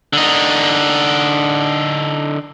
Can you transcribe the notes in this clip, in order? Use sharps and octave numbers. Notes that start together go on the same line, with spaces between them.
D3 D#4